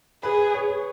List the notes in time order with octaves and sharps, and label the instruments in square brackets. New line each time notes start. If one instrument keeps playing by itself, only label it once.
[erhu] G#4 [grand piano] B4
[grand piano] C#5